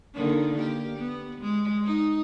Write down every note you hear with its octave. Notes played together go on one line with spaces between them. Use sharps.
D3 D#3 A#3
A#3 G4
B3
G#3
D#4 D#5